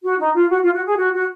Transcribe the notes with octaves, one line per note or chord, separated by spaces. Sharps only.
F#4
D#4
F4
F#4
F4
F#4
G#4
F#4
F#4